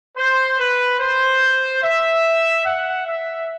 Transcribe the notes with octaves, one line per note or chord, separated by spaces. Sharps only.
C5
B4
C5
E5
F#5
E5